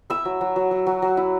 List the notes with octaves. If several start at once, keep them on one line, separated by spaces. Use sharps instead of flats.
E4 E5 E6
F#3
F#3
F#3
F#3
F#3
F#3
E4